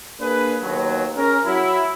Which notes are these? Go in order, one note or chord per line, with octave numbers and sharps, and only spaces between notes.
A#3 D4 G#4 B4
D#2 B2 F#3
C#4 G#4 A#4
F#3 E4